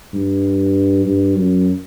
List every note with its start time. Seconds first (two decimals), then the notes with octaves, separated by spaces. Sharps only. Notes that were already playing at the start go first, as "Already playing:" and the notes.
0.13 G2
1.04 G2
1.35 F#2